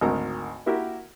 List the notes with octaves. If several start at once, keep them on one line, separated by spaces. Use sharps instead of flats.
G#1 D2 D#3 A#5
A#3 E4 F#4 G4 A#4